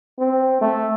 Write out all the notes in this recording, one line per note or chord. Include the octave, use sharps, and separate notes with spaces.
C4
A3